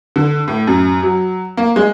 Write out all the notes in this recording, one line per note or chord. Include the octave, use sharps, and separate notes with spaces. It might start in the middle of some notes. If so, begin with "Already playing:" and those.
D3
A2
F#2
F#3
A#3
G#3